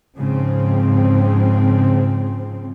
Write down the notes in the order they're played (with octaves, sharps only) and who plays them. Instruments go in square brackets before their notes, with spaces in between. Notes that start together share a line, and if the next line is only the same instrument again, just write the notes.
[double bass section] G#2 C#3 F3 C4